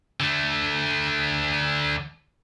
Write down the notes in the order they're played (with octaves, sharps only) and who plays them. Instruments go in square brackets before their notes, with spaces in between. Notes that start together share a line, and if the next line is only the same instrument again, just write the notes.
[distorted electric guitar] D3 A3